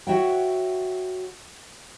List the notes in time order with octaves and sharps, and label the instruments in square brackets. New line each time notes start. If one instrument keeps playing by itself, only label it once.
[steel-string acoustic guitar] F#4 C#5 E5 F#5 G5